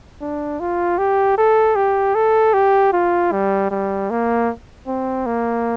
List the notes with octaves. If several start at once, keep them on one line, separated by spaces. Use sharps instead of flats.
D4
F4
G4
A4
G4
A4
G4
F4
G3
G3
A#3
C4
A#3